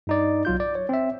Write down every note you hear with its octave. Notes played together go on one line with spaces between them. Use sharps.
G2 D#4 D5
B1 F#3 F4 G6
D5
C#5
C4 E5